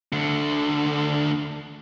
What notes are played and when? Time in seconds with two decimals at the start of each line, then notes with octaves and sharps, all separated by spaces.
0.13 D2 D3